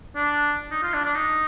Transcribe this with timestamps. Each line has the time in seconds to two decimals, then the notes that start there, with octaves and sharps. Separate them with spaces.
0.16 D4
0.71 D#4
0.83 F4
0.93 D4
1.05 D4
1.15 D#4